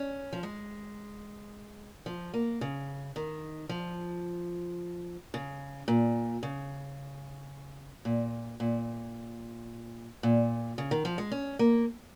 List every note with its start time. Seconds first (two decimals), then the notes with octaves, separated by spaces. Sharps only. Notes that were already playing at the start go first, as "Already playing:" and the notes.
Already playing: C#4
0.33 F3
0.43 G#3
2.06 F3
2.34 A#3
2.61 C#3
3.16 D#3
3.69 F3
5.34 C#3
5.88 A#2
6.43 C#3
8.05 A#2
8.60 A#2
10.23 A#2
10.78 C#3
10.91 D#3
11.05 F3
11.18 G#3
11.32 C#4
11.59 A#3